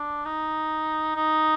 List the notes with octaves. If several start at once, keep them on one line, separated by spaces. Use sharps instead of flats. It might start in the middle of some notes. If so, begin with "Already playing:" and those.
Already playing: D4
D#4
D#4